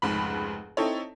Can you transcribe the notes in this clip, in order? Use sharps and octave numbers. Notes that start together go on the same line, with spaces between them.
F1 C#2 G#2 B5
C4 D#4 E4 A4 C#5